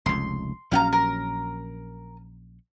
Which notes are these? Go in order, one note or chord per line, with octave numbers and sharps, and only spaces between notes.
F1 C#2 C6
A#1 F#3 C#4 F5 G5 A#5
A#4